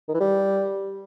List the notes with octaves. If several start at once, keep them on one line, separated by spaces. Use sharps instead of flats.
D#3
E3
G3